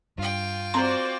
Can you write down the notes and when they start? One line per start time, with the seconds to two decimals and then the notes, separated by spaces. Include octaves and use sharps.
0.18 G2 F4 G5
0.74 C4 F#4 C5 D5 A#5 C6